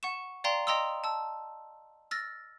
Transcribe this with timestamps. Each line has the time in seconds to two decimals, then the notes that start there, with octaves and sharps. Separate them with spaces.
0.03 F#5 C#6 E7
0.44 D5 F5 G5 A#5 C6
0.67 D#5 G5 A#5 C6 D#6 E6
1.04 A5 E6
2.11 E6 F6 A6 A#6